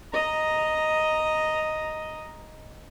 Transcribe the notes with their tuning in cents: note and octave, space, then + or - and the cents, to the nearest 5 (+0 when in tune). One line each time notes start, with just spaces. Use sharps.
D#5 +0 A#5 +0